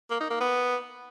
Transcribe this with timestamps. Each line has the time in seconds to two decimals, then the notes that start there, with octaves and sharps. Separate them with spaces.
0.10 A#3
0.20 D#4
0.30 A#3
0.40 B3